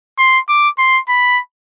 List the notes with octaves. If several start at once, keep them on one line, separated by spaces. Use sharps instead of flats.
C6
D6
C6
B5